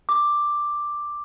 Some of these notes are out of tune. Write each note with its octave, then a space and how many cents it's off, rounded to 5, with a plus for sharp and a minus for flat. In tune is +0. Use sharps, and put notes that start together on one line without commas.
D6 +5